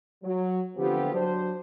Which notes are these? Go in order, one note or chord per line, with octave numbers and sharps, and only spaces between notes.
F#3
D3 F3 B3 C4 F4 G4
F#3 D4 C5